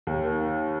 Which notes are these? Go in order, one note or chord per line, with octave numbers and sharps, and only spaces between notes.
D#2
D#3